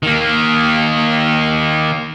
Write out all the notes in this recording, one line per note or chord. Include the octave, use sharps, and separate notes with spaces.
D#3 A#3